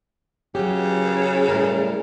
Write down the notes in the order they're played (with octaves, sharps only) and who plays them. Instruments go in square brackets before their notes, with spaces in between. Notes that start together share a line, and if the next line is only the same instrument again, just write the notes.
[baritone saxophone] C#3 [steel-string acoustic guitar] F#3 G4
[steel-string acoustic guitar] A2 G3 A#4